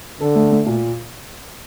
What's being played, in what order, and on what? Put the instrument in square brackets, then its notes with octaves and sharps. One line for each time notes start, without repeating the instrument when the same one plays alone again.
[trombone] D3 [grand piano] A4
[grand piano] A3
A3
A#2